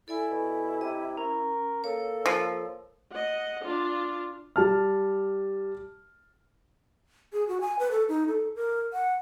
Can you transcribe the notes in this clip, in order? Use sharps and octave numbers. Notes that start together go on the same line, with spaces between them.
E4 A4 D5 G#5
B2
C3 D#5
C#4 A#4
A#3 A4 C#5
F3
D#5 F#5
D4 F4
G3 A5 F6
G#4
F#4
G#5
B4
A4
D#4
A4
A#4
F#5